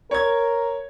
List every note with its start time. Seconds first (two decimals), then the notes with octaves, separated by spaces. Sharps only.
0.11 A#4 C#5 G#6